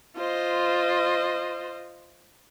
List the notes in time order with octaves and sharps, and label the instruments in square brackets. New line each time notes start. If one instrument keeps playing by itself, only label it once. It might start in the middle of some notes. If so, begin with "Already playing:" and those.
[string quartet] F4 C5 D#5